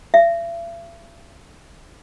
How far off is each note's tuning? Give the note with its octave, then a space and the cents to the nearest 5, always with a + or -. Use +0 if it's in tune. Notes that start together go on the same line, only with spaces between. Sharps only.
E5 +45